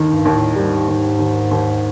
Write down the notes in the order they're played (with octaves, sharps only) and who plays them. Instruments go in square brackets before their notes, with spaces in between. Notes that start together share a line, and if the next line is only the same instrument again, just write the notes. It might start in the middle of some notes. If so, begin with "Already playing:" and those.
Already playing: [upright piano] D#2 D#3
[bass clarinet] G2
[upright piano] D#2
[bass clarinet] A2
[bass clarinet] G#2 [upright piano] G3
[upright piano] D#2
D#2
D#2